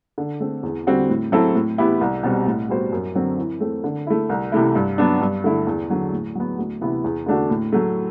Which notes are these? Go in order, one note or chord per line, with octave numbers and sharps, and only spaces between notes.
D3
A3 C4
E2
D3 G3 C4 F#4
A2
F#3 C4 E4 A4
A2
E3 B3 E4 G4
C2
B2 G3 C4
A2
G3 B3 F#4 C5
F#2
D3 F#3 C4
E3
A3 C4
D3
A3 E4
C2
C3 E3 A3 E4
G2
F#3 B3 D4
G2
D3 A3 E4
E2
D3 F#3
A2
F#3 B3
D2
C3 E3 B3 E4
E2
D3 A3 D4 F#4
A2
F#3 A3